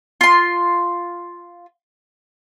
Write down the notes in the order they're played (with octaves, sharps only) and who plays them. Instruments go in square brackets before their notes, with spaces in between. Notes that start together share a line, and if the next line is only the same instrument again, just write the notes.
[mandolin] F4 C6